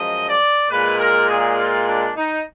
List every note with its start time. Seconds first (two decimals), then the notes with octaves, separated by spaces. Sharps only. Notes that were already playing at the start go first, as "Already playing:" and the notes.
Already playing: F#2 F3 G#3 D#5
0.28 D5
0.70 A#2 G#3 B4
0.99 A#4
1.29 G#4
1.58 F4
1.87 D4
2.16 D#4